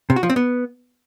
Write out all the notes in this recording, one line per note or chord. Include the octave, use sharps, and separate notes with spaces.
C3
F#4
F3
C4
B3